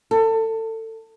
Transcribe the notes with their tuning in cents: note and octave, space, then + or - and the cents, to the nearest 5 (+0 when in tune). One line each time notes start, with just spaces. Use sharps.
A4 +25